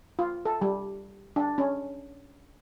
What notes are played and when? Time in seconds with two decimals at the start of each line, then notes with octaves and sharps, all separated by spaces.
0.19 F4
0.45 A4
0.61 G3
1.36 D4
1.58 C#4